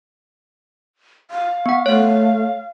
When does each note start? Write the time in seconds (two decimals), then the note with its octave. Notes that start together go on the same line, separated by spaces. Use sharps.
1.31 F5
1.66 B3 F#5
1.86 A3 C#5 F5